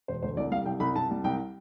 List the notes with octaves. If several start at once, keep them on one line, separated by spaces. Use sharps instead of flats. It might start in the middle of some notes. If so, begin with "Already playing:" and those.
E1 C5
D2 C5
C2 D5
G3 F5
C2 G5
C2 B5
C2 A5
G3
C2 G5